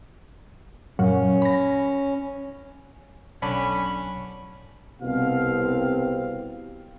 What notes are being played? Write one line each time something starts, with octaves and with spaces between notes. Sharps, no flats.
F#2 A#2 F#3 C#4
B5 A#6
B1 D3 C#4 D4 B5
C2 B2 C4 F5